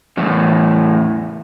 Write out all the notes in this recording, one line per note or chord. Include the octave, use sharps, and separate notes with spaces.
E2 A2